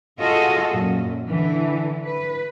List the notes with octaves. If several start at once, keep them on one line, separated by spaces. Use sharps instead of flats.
F4 F#4 G#4 A4 D#5
F#2 A#2
D3 E3
B4